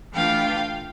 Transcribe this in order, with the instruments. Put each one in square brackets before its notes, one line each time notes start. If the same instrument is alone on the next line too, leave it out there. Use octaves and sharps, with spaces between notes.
[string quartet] E3 A3 D4 F4 F5 G5